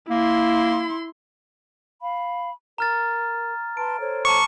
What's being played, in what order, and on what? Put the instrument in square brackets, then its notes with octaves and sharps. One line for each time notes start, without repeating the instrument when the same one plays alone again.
[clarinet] A#3 [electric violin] E4 C6
[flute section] F5 B5
[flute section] A#4 [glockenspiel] A#5 F6 A6
[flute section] B4 A5 C6 [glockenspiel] D7
[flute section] A4 C5 C#5
[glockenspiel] A5 A#5 D6 [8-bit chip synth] C#6